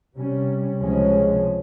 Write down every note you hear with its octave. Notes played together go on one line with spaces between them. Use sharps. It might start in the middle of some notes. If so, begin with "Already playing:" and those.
C3 G3 C#4
C#2 C3 F3 G#3 C#4